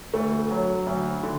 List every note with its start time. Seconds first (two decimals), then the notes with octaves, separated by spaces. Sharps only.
0.14 D2 A3
0.51 F#3
0.87 D2
1.23 D3